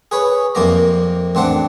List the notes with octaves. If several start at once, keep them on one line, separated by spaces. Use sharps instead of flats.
G#4 B4 C#5
F2 C3 A#3 D5 A#5
A1 C4 D4 F#5